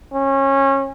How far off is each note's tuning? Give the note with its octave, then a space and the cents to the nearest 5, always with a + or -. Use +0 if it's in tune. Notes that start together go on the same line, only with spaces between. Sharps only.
C#4 -25